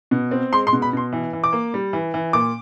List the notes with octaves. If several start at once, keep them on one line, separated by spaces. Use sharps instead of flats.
B2
C4
G#3 C6
C6
B2
B5
B2 C6
E3
E3
D6
A#3
G3
E3
E3
A#2 D6